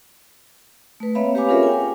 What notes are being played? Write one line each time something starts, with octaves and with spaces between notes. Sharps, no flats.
A3 B4
A#3 C4 C#5 E5 F5 B5
G4 B4 C#5 F5 G#5 D6
C#4 F4 G#4 A#4 C#5 E5
G5 G#5